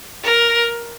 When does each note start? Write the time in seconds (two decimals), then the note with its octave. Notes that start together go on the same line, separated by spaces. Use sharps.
0.24 A#4